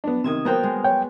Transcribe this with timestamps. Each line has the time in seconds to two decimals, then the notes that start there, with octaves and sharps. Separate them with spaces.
0.04 B3 D4
0.24 C3 D#3 D#6 G#6 E7
0.45 A#3 B3 F#4 A#4 C5 G5
0.63 G#3
0.84 C#5 G5